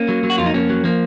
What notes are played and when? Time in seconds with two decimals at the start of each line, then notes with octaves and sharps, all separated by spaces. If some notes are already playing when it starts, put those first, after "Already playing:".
Already playing: A#3 C#4
0.08 F#3
0.24 F#3
0.30 F#4
0.38 F2 F4
0.46 D#4
0.54 F2 A#3 C#4
0.69 F#3
0.84 F3 A#3